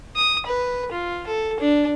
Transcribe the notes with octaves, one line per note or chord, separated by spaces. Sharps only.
D#6
B4
F4
A4
D4